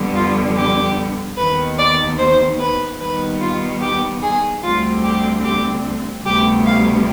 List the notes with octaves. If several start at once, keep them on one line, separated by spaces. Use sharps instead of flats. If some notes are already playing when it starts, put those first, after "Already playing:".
Already playing: F2 D3 G3 B3
F4
G4
D#2 D#3 B3 B4
D5
C5
B4
D#2 D#3 G3 B3 B4
F4
G4
G#4
D2 D3 G3 C4 F4
G4
G4
D2 C3 G3 B3 G4
F5